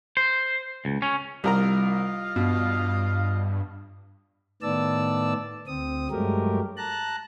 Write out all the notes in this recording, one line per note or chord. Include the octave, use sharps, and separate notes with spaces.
C5
C#2
C#4
C2 G3 F4 A#4 D#5 F5 A#5
G2 B2
A2 D#3 B3 D5 A5 E6
D2 C4 D#6
G2 F#3 G#3 A3 G4 A#4
A5 A#5 F#6